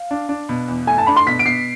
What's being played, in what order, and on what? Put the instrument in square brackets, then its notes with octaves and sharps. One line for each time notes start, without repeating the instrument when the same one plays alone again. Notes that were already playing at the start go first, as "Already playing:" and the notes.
Already playing: [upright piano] F5
[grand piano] D4
D4
B2
E2
[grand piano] A3 [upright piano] G#5
[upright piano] A5
[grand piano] D4 [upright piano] B5
[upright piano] C6
[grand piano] B2 [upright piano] B6
[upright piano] D7
[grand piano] B2 [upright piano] C7